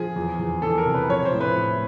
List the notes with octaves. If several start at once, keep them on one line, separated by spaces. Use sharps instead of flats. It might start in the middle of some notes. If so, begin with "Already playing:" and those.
Already playing: F3 G#4
E2
E2
E3 A4
A#4
C3
B4
F3 C#5
C5
A2
B4
A2